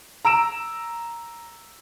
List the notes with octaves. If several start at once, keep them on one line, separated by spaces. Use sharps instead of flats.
A#5 E6 D7 E7